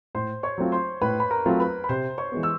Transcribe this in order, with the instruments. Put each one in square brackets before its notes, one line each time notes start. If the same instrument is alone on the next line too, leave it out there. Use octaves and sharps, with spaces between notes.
[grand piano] A2 [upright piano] C5 C6
[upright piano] C#5 C#6
[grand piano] F#3 A3 C4 F4
[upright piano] C5 C6
[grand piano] A2 [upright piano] B4 B5
[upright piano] B5
A#4 A#5
[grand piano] F#3 A3 C4 F4
[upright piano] B4 B5
B5
[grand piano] C3 [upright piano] C5 C6
[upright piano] C#5 C#6
[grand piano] E3 G#3 B3
[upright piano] E6